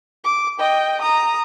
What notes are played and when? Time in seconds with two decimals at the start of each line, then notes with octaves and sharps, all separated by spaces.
0.24 D6
0.59 D#5 G5
1.01 A#5 D#6